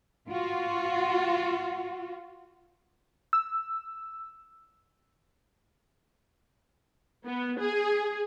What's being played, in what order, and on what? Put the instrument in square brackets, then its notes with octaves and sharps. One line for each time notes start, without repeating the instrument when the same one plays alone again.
[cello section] F4 F#4
[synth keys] E6
[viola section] B3
G#4